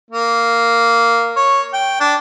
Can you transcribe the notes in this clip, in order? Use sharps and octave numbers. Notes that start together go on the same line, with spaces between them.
A#3
C#5
G5
D4